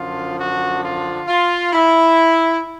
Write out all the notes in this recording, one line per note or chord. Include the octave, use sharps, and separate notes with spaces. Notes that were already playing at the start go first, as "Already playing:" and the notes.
Already playing: F#2 D3 F3 F4
F#4
F4
F4
E4